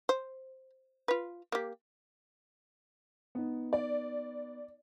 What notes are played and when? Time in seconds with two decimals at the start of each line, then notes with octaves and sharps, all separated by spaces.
0.09 C5
1.08 F4 B4
1.52 A#3 G4
3.35 B3 D#4
3.73 D5